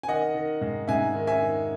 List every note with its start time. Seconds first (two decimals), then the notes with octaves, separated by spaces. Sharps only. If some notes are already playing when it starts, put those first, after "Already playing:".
0.03 G#5
0.08 D#3 D#5 F#5
0.34 D#3
0.61 G#2
0.88 G#2 E5 G#5
1.15 D#3
1.27 E5 G#5
1.41 D#3